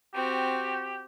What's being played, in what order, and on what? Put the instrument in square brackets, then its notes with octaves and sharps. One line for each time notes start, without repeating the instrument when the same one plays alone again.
[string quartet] C4 F#4 [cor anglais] G4